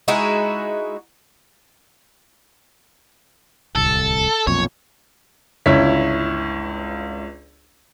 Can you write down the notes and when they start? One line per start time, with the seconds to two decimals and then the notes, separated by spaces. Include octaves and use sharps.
0.08 G#3 D#4 E4 F#4
3.75 D1 C2 A4
4.47 B1 F2 A#2 C#5
5.66 G1 C#2 E4 C#5 B6